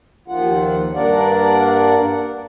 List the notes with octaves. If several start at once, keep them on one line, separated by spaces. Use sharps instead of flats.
D#2 D#3 F3 F4 F#5
G2 A#3 D4 A#4 D5 F#5